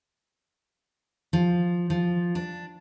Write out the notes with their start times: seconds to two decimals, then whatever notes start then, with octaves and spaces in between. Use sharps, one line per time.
1.33 F3
1.90 F3
2.35 D4